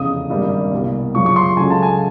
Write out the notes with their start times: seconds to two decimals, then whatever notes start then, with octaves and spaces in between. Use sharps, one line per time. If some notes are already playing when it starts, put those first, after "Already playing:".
Already playing: F1 E2 C#3 D#6
0.30 G#1 G2 D3 G3 A#3
0.72 C2 B2 G3 A#3
1.15 F#2 C#3 F3 C#6
1.26 C#6
1.36 C6
1.57 C#2 C#3 F#3 A3 G#5
1.70 A5
1.82 G#5